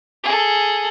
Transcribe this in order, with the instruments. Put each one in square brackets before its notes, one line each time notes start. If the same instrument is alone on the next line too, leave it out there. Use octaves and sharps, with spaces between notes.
[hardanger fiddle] G#4 A4